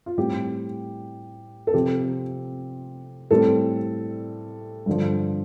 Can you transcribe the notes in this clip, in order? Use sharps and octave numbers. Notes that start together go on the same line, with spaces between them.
F4
A2 G3 C4 G4
A4
C3 F3 C4 G4
A2 G3 C4 A4
G2 D3 F3